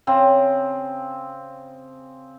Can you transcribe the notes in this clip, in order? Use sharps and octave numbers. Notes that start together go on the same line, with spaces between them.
C#3 C4